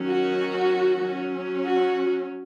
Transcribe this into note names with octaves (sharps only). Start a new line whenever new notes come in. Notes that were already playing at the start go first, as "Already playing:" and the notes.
Already playing: D#3 F#3 C#4
F#4
F#3 C#4
F#4